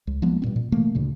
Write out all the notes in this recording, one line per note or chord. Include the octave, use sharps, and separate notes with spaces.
C#2
F3 G#3 A#3 B3
G2 A#2 C4
A#2
C3 E3 A3 A#3
D2 A#2 C#3